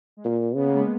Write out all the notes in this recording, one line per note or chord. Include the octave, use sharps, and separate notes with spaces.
G#3
A#2 A#3
C#3 B3
A#3
G#3 B3